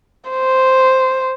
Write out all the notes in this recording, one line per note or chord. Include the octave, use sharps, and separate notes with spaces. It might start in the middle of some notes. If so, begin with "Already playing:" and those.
C5